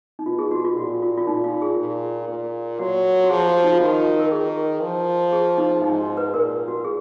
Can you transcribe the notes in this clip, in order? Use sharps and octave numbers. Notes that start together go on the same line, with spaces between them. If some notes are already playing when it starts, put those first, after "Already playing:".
D#4
B2 F4
G#4
F#4
F4
A#2 F#4
F4
F4
A#2 D#4
F4
G#4
A#2
A#2
F#3 F#4
F#4
F3 G#4
F#4
D#4
F4
D#3 F#4
A#4
D#3 G#4
F3
G#4
D#4
D#4
G#2 D#4
F#4
B4
A#2 A#4
F#4
G#4